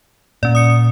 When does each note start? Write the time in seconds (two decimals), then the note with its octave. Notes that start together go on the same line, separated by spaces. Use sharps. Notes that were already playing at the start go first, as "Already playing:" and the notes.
0.43 A#2 C#4 D5
0.55 D#6 C#7